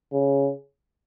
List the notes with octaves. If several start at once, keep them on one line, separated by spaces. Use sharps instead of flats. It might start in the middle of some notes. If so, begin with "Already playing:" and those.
C#3